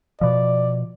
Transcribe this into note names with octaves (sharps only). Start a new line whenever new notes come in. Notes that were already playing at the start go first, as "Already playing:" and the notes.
B2 F3 D5